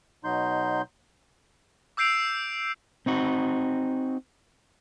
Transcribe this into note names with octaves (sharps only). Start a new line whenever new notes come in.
B2 F#3 D#4 C6 G6
D6 E6 G6 C7 D7 F7
C4 D#4 F#4